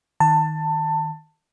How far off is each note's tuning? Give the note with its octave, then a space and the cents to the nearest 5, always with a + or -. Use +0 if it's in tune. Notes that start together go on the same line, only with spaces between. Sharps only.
D#3 +0 A5 +20